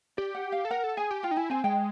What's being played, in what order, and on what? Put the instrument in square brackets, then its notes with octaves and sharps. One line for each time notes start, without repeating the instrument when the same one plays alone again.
[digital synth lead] G4 [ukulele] D5
[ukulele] F#5
F5
[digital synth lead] A4
[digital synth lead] A#4 [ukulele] F#5
[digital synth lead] A4
[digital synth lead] G#4 [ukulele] G#5
[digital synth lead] G4
[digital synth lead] F4 [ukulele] G5
[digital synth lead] D#4
[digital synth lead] E4 [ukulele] G#5
[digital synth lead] C4 [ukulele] G#5
[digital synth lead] G#3 [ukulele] G5